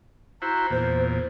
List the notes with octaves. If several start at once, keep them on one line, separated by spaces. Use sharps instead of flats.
E4 F#4 C5 A#5
E2 A#2 C5